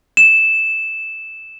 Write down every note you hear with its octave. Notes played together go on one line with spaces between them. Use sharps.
E7